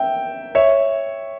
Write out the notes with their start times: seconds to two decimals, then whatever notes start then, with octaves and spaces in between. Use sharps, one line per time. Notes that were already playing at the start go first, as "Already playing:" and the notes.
Already playing: E5 G5
0.55 C#5 E5